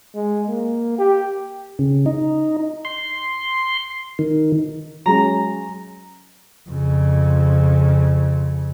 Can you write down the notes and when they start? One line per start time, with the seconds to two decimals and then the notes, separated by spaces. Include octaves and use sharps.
0.15 G#3
0.48 A#3
0.99 G4
1.79 C#3
2.06 D#4
2.85 C6
4.19 D#3
5.06 F#3 G#3 C#4 A#5
6.69 F2 C#3